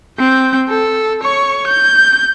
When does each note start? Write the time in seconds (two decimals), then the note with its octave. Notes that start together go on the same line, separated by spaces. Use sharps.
0.19 C4 G6
0.69 A4
1.22 C#5 C#6
1.67 G6